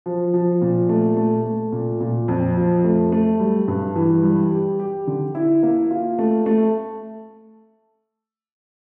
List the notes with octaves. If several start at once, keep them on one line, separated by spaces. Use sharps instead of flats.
F3
F3
A#2
A3
A3
A3
A#2
A#2
F2
F3
A3
A3
G3
G2
E3
G3
G4
G4
D3
E4
A#3
F4
A3
A3